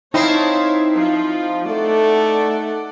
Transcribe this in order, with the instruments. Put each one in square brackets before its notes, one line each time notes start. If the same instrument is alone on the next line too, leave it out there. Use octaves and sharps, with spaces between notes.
[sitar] C4 E4 [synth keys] D#4 C7 [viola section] C#5 F5 A5
[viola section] F3 F4
[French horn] A3 [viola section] A4 D5 F#5